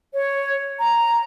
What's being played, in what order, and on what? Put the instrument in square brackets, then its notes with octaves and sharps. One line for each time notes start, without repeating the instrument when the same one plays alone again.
[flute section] C#5
A#5